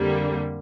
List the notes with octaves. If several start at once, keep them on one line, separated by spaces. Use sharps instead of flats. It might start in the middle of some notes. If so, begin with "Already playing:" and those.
Already playing: F2 D3 G3 A#3